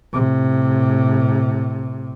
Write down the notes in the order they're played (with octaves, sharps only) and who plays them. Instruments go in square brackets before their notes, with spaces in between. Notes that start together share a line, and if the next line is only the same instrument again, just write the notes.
[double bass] A2 C3